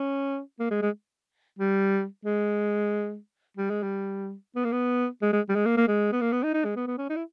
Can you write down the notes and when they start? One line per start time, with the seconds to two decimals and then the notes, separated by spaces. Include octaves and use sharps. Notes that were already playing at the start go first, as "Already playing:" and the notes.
Already playing: C#4
0.60 A#3
0.71 G#3
0.82 G#3
1.59 G3
2.25 G#3
3.57 G3
3.70 G#3
3.83 G3
4.56 B3
4.64 A#3
4.72 B3
5.22 G#3
5.33 G#3
5.49 G3
5.55 G#3
5.66 A#3
5.77 A#3
5.88 G#3
6.12 B3
6.21 A#3
6.32 B3
6.43 D#4
6.54 D#4
6.64 G#3
6.76 B3
6.87 B3
6.98 C#4
7.09 D#4
7.16 E4